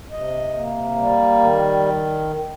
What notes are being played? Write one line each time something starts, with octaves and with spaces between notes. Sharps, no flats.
C3 D#5
A#3
G3
D#3